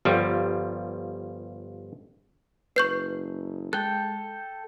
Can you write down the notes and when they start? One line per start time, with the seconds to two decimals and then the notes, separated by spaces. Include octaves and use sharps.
0.05 G1 F3 G3
2.76 F#1 B4 C#6 G6 C7
3.73 G#3 A4 G5 F#6